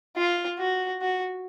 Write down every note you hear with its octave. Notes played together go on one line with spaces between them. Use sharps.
F4
F#4
F#4